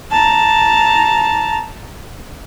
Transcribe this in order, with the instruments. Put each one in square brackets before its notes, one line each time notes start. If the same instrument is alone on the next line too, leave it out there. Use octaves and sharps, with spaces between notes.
[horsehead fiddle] A5 A#5